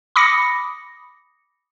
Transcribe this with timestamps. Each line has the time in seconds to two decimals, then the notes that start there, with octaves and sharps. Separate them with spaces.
0.16 B5 D6 D#6 A#6 C#7